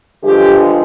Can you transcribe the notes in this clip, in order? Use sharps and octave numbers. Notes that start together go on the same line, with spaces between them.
G2 D3 F3 G#3 G4